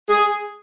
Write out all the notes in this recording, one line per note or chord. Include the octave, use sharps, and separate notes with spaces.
G#4